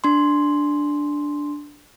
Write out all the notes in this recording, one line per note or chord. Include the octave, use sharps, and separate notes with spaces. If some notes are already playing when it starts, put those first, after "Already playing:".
D4 C6